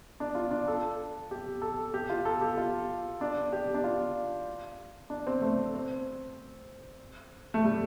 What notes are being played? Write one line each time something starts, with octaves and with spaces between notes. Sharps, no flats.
D4
F4
D4
A4
G4
A4
G4
F4
A4
G4
F4
D4
G4
D4
F4
D4
C4
A3
C4
A3
G3